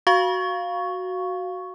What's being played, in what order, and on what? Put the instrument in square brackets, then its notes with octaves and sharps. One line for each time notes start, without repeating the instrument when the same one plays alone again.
[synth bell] F#4 F5 C#6